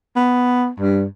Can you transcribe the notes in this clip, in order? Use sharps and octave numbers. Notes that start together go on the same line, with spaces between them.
B3
G2